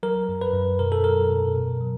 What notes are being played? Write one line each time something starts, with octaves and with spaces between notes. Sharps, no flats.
F#3 A#4
F#2
B4
F#2
B2 A#4
A4
F#3 A#4
B2
B2
F#3